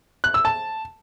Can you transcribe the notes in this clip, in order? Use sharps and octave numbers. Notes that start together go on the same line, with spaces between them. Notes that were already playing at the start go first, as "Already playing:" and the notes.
F#6
E6
A5